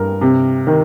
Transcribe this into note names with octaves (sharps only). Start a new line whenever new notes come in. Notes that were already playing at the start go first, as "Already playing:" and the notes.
Already playing: G2 A#4
C3
D#3